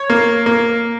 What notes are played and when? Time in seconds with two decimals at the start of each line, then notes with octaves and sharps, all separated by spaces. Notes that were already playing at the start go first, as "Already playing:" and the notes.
Already playing: C#5
0.10 A#3
0.46 A#3